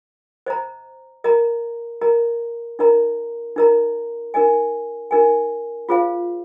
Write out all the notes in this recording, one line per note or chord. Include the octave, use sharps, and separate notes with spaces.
C5 D#5 A#5
A#4 D#5 A#5
A#4 D#5 A#5
D#4 A#4 D#5 A#5
D#4 A#4 D#5 A#5
D#4 A#4 D#5 G#5
D#4 A#4 D#5 G#5
F4 G#4 C5 F5